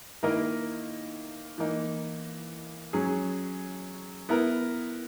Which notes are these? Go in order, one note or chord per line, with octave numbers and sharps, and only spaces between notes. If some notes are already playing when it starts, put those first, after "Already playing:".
D#3 A#3 E4 A#4 D#5
E3 A#3 D#4
F#3 C#4 G#4
B3 E4 A#4